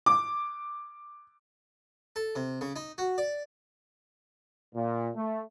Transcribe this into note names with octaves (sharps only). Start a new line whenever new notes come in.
D6
A4
C3
C#3
D#4
F#4
D5
A#2
A3